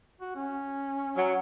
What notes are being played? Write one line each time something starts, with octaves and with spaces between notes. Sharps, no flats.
F#4
C#4
F#3